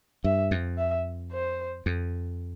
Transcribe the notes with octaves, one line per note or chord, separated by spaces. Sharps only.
G2 E5
F2
E5
C5
F2